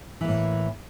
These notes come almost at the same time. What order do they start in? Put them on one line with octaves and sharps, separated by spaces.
E3 A#3 A2